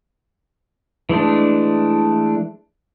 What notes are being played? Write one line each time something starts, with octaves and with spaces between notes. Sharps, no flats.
E3 G#3 A3 D4